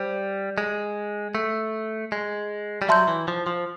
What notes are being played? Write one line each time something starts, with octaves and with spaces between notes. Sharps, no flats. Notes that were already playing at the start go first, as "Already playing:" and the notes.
Already playing: G3 C5
G#3
A3
G#3
G3
F#3 E5 A5 C6 E6 G6
E3
F3
F3